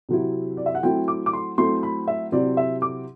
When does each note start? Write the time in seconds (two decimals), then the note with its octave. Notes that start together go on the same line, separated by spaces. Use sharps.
0.09 C3 F#3 C4 E4
0.57 D5
0.66 E5
0.75 F#5
0.83 F#3 A3 C4 E4 G5
1.08 D6
1.26 D6
1.33 C6
1.58 F#3 A3 C4 E4 C6
1.83 B5
2.08 E5
2.32 C3 F#3 C4 E4 D5
2.57 E5
2.82 D6